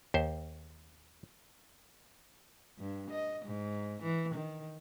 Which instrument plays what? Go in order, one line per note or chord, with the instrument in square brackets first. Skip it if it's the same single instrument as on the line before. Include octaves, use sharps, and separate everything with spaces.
[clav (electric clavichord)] D#2 C5
[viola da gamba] G2
D#5
G#2
E3
D#3